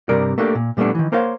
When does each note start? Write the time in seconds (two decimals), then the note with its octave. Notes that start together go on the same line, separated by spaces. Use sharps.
0.09 G2 C3 G3 A#4 D5
0.38 A3 A#3 D4 G4
0.55 A#2
0.77 A#2 G3 A3 B3 D4
0.95 D#3 E3
1.12 A#3 A#4 C5 C#5 F5